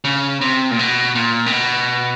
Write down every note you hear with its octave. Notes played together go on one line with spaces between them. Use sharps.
C#3
C3
A#2
B2
A#2
C3
B2